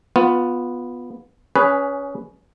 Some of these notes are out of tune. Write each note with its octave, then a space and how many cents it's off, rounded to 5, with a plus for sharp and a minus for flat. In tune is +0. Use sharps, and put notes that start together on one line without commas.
B3 +0 F4 +20
C#4 +15 G#4 +0 B4 +0